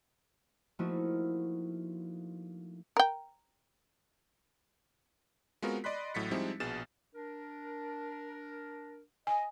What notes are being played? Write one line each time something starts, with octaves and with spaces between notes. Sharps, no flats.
F3 A3 A#3 D#4 E4 F#4
A#4 G5
G#3 B3 C4 F4 F#4 A#4
D5 D#5 B5 C6 F#6 B6
A1 A2 F#3 A6 B6 C#7
F3 G3 G#3 C4 D#4 E4
A#1 B2 G#4 A6 E7
D4 A#4
D#5 G#5